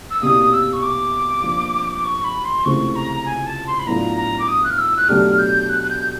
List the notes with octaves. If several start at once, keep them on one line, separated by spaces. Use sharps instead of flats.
E6
C2 B2 G3 A#3 D#6
E6
C#6
D6
F3 A#3 D4
D6
C#6
B5
C6
C#2 C3 E3 A3 C4 C#6
A#5
G#5
A5
C6
B5
A2 F#3 B3 D4 F4 A#5
A#5
D6
D#6
F#6
F6
E6
F#6
B2 F#3 A3 D4 G4 F6
G6
F#6
F#6
G6